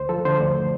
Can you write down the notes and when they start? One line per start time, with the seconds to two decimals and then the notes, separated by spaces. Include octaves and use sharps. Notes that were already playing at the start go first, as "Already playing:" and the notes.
Already playing: D2 C5
0.09 F3 A4
0.25 D3 C5
0.40 D2 D5